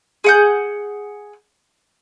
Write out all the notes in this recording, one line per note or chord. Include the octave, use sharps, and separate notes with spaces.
G#4 F#5 G6